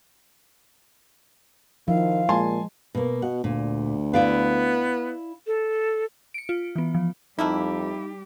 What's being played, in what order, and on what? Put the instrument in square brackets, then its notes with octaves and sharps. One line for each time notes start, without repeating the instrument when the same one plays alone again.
[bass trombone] D#3 [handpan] F3 [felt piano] E4 [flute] F5
[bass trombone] A#2 [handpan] G#3 [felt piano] G#5 A5 C6
[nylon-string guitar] B2 A#3
[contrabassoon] B2 [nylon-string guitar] F#5
[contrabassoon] D2 [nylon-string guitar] A#2
[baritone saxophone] B3 [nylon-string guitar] E4 D5 F5
[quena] A4
[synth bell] C#7 D7
F4
E3 B3
F3
[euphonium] F2 [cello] G3 G4 [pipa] A3 A#3 E4 [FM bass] D#4